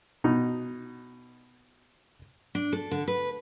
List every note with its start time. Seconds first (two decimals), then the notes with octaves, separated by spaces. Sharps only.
0.24 B2 D#4
2.55 D4
2.73 A4
2.91 D3
3.08 B4